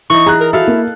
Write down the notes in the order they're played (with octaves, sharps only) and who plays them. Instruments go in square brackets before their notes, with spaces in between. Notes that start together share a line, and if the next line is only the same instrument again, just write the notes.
[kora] E3 D#4 [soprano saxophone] C#6
[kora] G#4 [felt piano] A#5 F#6
[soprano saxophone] A#4
[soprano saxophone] E4 [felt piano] F#4 [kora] A4 F5
[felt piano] A#3